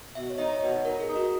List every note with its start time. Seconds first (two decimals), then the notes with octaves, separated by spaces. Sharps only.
0.15 B2 E5
0.30 C#5
0.38 D#4 D#5
0.53 C#5
0.61 B2
0.85 D#4 A#4
1.00 G#4
1.07 D#4
1.16 F#4